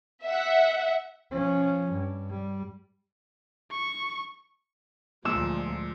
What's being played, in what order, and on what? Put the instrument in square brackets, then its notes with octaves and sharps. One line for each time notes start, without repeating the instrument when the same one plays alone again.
[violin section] E5 F#5
[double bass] F3 C#4
G2
G3
[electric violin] C#6
[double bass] D2 F3 [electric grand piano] A#2 G#3 [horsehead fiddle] A#3 [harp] E6